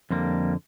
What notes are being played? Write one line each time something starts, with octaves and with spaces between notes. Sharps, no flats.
F2 D3 G3 A#3